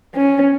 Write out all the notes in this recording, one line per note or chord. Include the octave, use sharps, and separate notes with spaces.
C#4